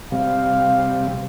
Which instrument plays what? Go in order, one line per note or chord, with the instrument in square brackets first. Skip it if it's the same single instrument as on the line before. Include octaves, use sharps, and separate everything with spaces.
[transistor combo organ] C3 G3 [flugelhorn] F5